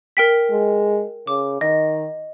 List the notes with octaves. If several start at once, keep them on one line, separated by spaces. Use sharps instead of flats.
A#4 G5 B6
G#3
C#3 D6
D#3 D#5